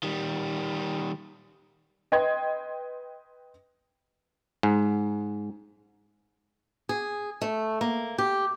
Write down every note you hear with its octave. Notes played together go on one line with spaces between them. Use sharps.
D#3 G3
B4 D#5 G5 C6 G#6
G#2
G#4
A3
A#3
G4